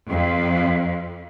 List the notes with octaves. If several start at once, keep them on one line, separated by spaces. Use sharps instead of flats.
F2